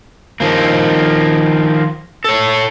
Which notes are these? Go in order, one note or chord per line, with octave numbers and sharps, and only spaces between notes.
D#3 F3 A#3
A4 C#5